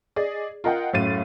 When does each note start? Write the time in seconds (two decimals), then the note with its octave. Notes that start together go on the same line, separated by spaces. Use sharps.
0.16 G#4 D5 D#5
0.64 F4 A#4 D#5 F#5 G5
0.93 F#2 A2 F5 A6 D#7